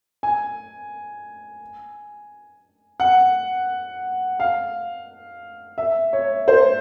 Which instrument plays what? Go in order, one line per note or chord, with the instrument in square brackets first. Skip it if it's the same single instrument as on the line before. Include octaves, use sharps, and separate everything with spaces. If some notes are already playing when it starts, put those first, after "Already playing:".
[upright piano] G#5
F#5
F5
E5
C#5
C5